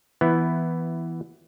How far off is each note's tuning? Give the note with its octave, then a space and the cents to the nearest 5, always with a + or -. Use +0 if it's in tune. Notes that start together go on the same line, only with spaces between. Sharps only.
E3 +5 B3 +0 E4 +0